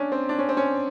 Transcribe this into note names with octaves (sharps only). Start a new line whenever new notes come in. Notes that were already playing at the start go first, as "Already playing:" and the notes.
Already playing: C#4 D4
C4
D4
C#4
C4
C#4